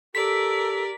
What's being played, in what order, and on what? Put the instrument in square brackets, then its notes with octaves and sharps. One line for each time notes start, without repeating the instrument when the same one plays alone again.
[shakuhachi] G4 [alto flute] A4 [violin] A#4 D5 [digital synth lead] B6